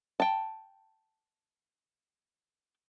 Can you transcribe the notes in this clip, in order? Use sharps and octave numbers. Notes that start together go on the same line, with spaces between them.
G5 A5